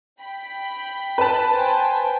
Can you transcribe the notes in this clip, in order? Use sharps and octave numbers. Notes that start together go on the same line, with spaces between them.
G5 B5
B4 A5
C5 G5 G#5